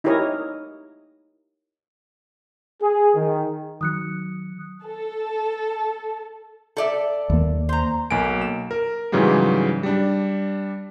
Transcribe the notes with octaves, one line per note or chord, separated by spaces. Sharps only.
D#4 E4 G4 A#4 C#5 D#5
G#4
D#3
D#3 F#3 D#6 F#6 C#7
A4
A4 D5 E5
D#2 A#3
C5 A#5
B1 A#3 G#5 D7
E7
A#4
G#2 C#3 E3 F#3 G3
G3 D4